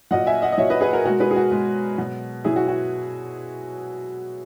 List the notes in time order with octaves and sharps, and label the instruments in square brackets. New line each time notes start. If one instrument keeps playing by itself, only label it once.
[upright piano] A#2 F#3 D#5 F#5
E5 G#5
D#5 F#5
D#5
A#2 F#3 C#5 E5
B4 D#5
G#4 B4
F#4 A#4
B2 G#3 F#4 A#4
G#4 B4
G#4
F#4
B2 G#3
B2 F#3
B2 F#3 E4 G#4
F#4
F#4